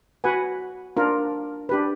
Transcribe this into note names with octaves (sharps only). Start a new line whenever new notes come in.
F#4 B4 F#5 G#5
D4 F4 A#4
D4 G4 B4